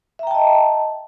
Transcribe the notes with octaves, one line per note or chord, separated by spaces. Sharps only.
D#5 E5 G5 A5 A#5